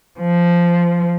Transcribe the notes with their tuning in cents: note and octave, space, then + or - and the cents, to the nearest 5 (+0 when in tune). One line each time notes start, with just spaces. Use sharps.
F3 -10